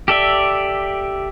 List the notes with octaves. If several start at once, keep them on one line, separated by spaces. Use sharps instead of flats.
G4 A4 D5 E5